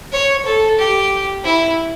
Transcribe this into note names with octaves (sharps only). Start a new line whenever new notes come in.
C#5
A4
G4
E4